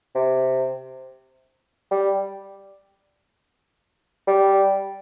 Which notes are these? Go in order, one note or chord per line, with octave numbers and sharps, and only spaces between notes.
C3
G3
G3